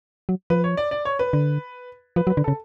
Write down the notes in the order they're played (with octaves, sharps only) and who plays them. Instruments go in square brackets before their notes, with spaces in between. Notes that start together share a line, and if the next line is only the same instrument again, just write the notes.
[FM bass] F#3
[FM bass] F3 [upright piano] B4
[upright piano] C#5
D5
D5
C#5
B4
[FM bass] D3
[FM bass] F3 [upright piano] B4
[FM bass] F#3
[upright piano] B4
[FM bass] D3
[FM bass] C#3 [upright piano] A4